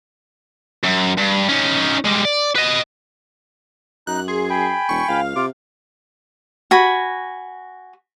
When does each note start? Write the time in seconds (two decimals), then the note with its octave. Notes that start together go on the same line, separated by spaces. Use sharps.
0.84 F#2
1.18 G2
1.49 C#4 D#4
2.06 G3 G#3
2.25 D5
2.55 B4 D#5
4.07 F#2 D#4 F#6
4.28 G#4 C6
4.50 G5 G#5 B5
4.89 E1 C#6
5.08 C#2 F5
5.36 C3 F4 D6
6.71 F#4 G#5 B5